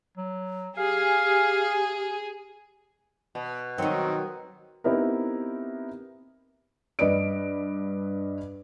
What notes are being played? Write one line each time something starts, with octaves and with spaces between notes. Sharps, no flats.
F#3
G4 G#4 F5
B2
D#3 F#3 C4 D#4
B3 C4 D#4 E4 G4 A#4
G2 B4 D5 D#5 D7